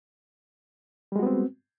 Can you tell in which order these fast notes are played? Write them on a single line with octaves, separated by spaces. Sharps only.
G3 G#3 F#4 B3 C4